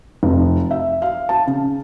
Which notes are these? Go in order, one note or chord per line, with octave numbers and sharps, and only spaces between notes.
F1
E5
F5
A5
C#3